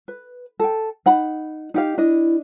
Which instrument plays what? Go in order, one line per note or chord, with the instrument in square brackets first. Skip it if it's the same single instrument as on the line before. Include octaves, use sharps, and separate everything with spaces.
[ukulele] B4
A4 G5
D#4 F#5 B5
D#4 G4 F5
[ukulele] D4 D#5 [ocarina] E4